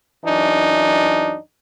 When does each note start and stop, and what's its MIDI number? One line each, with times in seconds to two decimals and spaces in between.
0.24 1.37 42
0.24 1.37 52
0.24 1.37 62
0.24 1.37 63